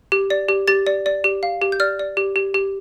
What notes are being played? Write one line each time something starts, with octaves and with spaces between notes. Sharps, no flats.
G4
D5
G4
G4 A6
D5
D5
G4
F5
G4
G6
D5 F6
D5
G4
G4
G4